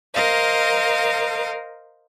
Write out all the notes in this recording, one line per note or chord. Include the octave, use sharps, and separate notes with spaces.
A#4 C5 D#5 F5